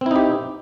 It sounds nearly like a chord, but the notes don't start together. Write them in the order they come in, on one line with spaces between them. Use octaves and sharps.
C4 E4 D#4 G4